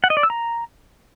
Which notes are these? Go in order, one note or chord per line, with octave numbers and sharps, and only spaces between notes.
F#5
D#5
D5
E6
A#5